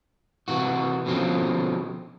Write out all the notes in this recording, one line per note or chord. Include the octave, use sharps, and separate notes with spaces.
C3 E3 F#4
B2 D3 F3 C4 C#4